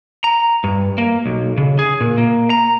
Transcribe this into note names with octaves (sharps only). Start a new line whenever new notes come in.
A#5
G2
A#3
B1
C#3
G#4
A#2
A#3
A#5